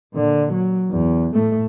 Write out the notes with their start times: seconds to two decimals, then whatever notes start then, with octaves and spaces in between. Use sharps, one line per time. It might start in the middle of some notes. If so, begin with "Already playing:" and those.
0.13 A#2 D3
0.53 F#3
0.90 E2
1.33 A2 A3